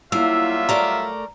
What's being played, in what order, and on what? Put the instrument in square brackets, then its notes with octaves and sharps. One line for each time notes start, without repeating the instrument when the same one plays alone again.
[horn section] F#3 G3 F4 [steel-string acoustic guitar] A#3 [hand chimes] E4 E6 [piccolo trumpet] E5
[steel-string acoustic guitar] A3 A#4 D5 [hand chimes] A#5